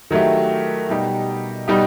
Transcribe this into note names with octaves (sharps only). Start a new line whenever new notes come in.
D#3 F#3 A3 E4 G4
B2 G3 D#4 G4
B2 G3 D#4 G4